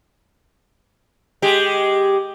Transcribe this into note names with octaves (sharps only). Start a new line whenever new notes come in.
G#3 G4